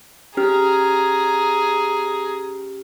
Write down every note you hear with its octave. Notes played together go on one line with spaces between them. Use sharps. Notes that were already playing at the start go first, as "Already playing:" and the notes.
C#4 G4 G#4 A#5 F6